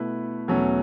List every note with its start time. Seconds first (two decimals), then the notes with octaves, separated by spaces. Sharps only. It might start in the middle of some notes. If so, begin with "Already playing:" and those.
Already playing: B2 A3 E4 B4
0.48 E2 B2 F#3 A3 C#4